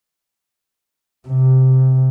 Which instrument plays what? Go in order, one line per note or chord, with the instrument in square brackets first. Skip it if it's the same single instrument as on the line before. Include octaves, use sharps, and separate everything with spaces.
[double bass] C3